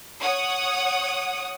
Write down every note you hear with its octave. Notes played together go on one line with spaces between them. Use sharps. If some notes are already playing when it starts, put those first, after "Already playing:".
C#5 F#5 D#6